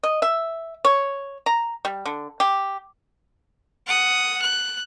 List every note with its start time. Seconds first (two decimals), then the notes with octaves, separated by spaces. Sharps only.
0.03 D#5
0.22 E5
0.85 C#5
1.46 A#5
1.85 G3
2.06 D3
2.40 G4
3.87 F#5 D#6
4.42 F#6